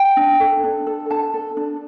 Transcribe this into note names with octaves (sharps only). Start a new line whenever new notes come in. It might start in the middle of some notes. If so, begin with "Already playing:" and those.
Already playing: G5
D4
A4
D4
A4
D4 A5
A4
D4